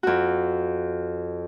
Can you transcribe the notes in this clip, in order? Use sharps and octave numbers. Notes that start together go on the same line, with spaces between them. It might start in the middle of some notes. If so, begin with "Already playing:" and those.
F2 F#4